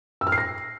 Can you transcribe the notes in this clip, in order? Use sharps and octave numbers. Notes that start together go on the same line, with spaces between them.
E6
F6
C7
A#6